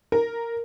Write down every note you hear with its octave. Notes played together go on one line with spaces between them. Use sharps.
A#4